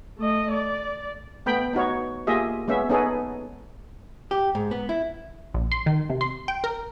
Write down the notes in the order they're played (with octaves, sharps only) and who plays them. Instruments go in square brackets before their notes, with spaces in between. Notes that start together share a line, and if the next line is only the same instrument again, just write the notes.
[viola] A3 D#5
D5
[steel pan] A3 B3 G5 B5
B3 D#4 F#4 C#5
A#3 F4 G4 G#4 D#5 E5
G#3 B3 C#4 E5
B3 C#4 D#4 G#4 A4 B4
[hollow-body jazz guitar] G4
G#2
B3
E4
[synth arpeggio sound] A#1
C6
D#3
C3
C6
G5
A#4